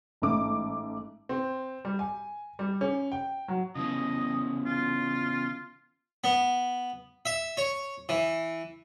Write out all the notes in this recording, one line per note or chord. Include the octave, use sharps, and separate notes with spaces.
A1 G#2 A3 D6
C4
G3
G#5
G3
C#4
G5
F#3
C#3 E3 B3 D#5
F4
B3
E5
C#5
E3